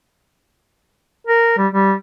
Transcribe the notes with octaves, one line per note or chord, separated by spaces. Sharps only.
A#4
G3
G3